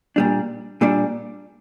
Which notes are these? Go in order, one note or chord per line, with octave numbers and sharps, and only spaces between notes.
A#2 G3 D4
A#2 G3 D4